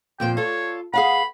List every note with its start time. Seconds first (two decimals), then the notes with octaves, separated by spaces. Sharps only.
0.20 F2 A#2 C5 G5
0.37 F4 A4 C#5
0.93 G#4 F5 F#5 B5